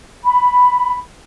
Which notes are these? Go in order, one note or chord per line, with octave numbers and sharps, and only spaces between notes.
B5